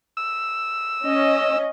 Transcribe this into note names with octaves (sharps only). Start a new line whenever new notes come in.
E6
C#4 D#5